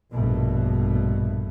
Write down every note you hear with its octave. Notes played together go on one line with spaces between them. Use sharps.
A#1 G2 B2 A3